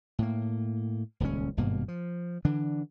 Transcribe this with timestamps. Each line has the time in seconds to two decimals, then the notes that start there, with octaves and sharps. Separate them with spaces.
0.19 A2 A#3
1.20 D#1 C#2 B2 C#4
1.57 G#1 G2 B2 A#3
1.88 F3
2.45 D3 E3 D4